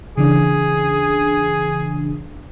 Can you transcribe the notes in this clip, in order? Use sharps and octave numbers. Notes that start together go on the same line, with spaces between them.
C#3 E3 D4 G#4